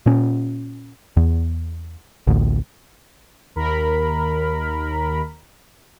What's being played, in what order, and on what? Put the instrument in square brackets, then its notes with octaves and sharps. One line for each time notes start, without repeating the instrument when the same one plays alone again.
[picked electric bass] A#2 C#4
E2
A1 D2
[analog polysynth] D#2 A#4 B5